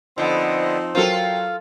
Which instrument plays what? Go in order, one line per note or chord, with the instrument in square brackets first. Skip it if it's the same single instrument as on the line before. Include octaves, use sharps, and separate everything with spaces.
[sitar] D3 B3 [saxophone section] F3 C4 D#4 [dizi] D#5
[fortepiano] F#3 A#4 C5 [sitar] F4 A4 [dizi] G5